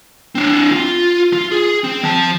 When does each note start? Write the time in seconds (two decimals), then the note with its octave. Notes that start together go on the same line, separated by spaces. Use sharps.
0.35 C4 D4
0.71 F4
1.33 F4
1.52 G#4
1.84 C4
2.03 F3 A5